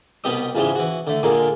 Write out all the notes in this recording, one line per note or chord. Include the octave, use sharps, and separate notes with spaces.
C2 B2 B3 G4 D#5 D#6
C#2 G#2 E3 G3 G#3
E3 F#4
D3 A3
A#2 D3 G#3 A#3